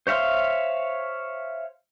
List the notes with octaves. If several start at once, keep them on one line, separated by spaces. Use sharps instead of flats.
C5 C#5 E5 F5 C6